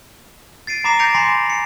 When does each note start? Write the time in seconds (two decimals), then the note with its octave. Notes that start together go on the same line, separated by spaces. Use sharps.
0.67 A6 C7 D7 D#7
0.84 A#5 B5 D6 A#6 C7 E7
0.99 G6 A6 A#6 C#7 D7 F7
1.14 G#5 B5 C6 D6 A#6 C7
1.50 C#7